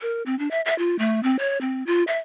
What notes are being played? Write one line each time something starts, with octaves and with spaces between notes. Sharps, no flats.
A#4
C4
D4
E5
E5
F4
A3
C4
C#5
C4
F4
E5